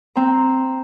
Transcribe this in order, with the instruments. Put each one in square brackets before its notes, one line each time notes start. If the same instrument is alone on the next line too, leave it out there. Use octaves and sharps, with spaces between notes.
[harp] C4 A#5